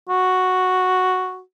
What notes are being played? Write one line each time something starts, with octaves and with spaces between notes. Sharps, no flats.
F#4